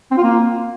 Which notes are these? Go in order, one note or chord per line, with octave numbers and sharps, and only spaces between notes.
C4
F4
A#3